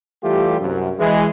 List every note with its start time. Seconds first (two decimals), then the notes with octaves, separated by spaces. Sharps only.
0.24 E3 G3 A3 F4 G4
0.60 C2 F#2
0.98 E3 G#3